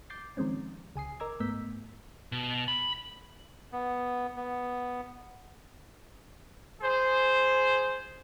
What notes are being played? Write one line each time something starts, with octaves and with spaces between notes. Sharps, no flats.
D6 G6 A6 C7
D#3 F3 G#3 C4 C#4
C#2 G#5 D#6 C7
A#4 D#5 A#5 D6 E6 G#6
G#2 A3 B3 E6 G6 B6
B2
B5
B3
B3
G#4 C5